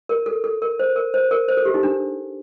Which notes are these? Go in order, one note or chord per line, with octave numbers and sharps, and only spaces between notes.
A#4
A4
A4
A#4
C5
A#4
C5
A#4
C5
A4
G4
D#4
D4